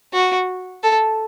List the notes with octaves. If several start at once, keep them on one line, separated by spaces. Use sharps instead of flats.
F#4
A4